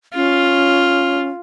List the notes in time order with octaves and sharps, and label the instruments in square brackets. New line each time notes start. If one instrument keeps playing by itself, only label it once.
[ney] C#4 [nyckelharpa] F4